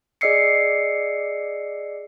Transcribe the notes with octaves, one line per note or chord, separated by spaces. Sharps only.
G#4 D5 D#5 E6 C7 C#7